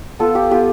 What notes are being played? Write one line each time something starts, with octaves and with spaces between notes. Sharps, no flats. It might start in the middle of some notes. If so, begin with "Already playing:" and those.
B3 F4 A4
G4
B3 F4 G4